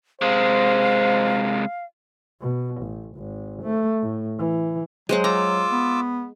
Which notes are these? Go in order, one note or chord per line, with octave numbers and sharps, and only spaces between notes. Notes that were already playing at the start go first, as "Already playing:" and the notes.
C3 G#3 C5 F5
B2
A1
G#1
A3
A2
E3
F#3 G#3 C5 F#5
F4 A#5 D6 E6
B3